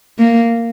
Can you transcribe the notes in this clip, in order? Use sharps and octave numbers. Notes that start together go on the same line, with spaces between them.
A#3